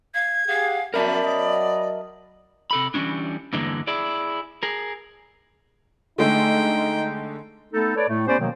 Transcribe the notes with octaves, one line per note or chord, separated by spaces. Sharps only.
F5 G#6
G4 G#4 F5 F#5
F#2 A#4 D5 E5 A5 B5
F#3 D#5
C3 A4 B5
E3 G3 A3 C#4 D4
E2 G2 D3 E3 G#3 A#3
E4 G#4 D5
G#4 A#4
D3 G#3 A3 D#4 G5
A3 B3 D#4 A4
A4 B4 C#5 D5
A2 A3
B3 C#4 G4 C5 D5
B2 D#3 F3 F#3 A#3